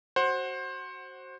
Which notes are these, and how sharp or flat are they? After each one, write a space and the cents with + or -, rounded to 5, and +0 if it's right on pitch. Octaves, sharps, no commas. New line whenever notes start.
F#4 +15 C5 +20 F#5 +0